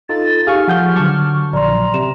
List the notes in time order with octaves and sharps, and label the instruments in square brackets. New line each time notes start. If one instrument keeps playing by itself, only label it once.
[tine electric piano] D#4 F4 A4 [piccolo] A6
[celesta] D#4 G4 F5 [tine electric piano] G#4 G#5 C#6 [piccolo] F6
[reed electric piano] F3 [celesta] F#5 G6 G7
[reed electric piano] D3 F#3 [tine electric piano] A5 C#6 D6
[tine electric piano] A#1 [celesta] D5 C6 [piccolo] A#5
[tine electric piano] C3 [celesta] E7